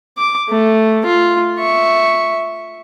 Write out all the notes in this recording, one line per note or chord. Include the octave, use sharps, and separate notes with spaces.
D6
A3
F4
E5 C#6